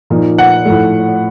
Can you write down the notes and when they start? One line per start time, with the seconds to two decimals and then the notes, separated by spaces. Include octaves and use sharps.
0.10 A#2 F3 A#3 D#4
0.38 F#5
0.65 A2 F3 A3